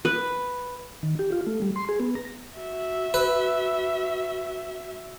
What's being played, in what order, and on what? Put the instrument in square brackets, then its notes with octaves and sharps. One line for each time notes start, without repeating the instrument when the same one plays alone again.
[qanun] B4
[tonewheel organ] D#3
G4
F4
A3
G3
C6
G#4
B3
A#5
[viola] F#4 E5
[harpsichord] B4